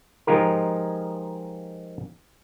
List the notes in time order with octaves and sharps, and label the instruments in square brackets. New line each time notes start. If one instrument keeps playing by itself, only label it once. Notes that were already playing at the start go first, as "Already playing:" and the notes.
[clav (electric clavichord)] F3 G#3 D#4 F4 G4 A#4